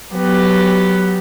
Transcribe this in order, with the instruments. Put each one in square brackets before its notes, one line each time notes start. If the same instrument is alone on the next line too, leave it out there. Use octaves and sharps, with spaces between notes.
[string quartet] F#3 B3 G4